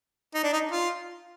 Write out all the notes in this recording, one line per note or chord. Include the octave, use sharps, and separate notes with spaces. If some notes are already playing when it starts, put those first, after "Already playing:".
D#4
D4
D#4
F4